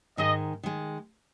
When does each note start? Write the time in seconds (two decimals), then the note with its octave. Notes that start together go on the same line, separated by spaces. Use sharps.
0.17 G#2 D#3 G#3 D#5
0.63 D#3 G#3